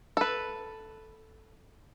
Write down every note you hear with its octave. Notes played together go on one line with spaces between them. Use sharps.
A4 B4